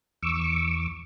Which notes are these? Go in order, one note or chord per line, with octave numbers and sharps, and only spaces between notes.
E2 C#6 D6 E6